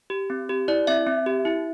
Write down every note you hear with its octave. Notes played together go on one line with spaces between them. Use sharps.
G4
C4
G4
E4 D5
C4 E5
C4
G4
E4